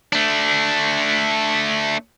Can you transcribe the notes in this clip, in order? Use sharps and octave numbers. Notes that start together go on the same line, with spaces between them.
A3 D4